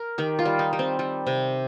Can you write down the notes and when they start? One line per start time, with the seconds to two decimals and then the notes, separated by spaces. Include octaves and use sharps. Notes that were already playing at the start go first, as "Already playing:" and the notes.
Already playing: A#4
0.18 D#3 G4
0.39 F4
0.45 G3
0.59 D#4
0.73 G3
0.79 C4
0.99 G3
1.27 C3